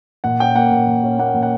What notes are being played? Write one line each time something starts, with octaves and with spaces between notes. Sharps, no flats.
A#2 F#5
C#4 G5
A#3 F#5
A#2
A#2
C#4
A#3 F#5
A#2
F#5